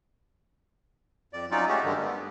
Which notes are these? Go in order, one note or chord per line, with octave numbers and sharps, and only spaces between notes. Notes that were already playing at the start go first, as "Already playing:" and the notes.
F2 D5
F#3 C#4 D#4 F4 D5
G#3 A3 C#4 F#4 G4
G2 D3 D#3 G#3
B3